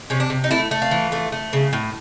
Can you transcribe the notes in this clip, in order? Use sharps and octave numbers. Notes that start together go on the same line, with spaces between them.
C3 C#4
D4
C3
D#4
A3 E4
A3
F4
E3
A3
A3
C#3
A2